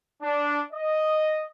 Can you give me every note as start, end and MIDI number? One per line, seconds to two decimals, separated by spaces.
0.22 0.62 62
0.73 1.49 75